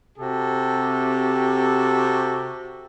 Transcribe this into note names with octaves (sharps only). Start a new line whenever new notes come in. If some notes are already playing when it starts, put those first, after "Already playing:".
C3 C4 F#4 G4 A4